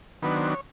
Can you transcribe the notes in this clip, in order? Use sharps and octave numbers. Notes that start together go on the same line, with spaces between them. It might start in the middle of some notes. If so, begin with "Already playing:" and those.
D#3 F#3 B3 D4 B4
C5
C#5